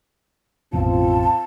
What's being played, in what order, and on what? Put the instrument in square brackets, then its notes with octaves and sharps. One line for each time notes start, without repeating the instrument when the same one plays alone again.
[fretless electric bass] A1 F2 B2 [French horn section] C4 F4 [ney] A5